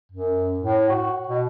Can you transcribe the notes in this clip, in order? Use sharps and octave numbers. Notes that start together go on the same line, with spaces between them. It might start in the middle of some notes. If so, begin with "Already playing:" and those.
F#2
A2
F#4
B2